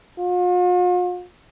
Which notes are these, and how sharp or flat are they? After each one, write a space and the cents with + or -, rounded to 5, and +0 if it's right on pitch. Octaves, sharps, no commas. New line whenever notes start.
F4 +45